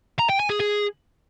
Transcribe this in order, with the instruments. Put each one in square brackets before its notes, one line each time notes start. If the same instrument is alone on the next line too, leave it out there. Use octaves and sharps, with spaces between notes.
[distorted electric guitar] A#5
G5
G#5
G#4
G#4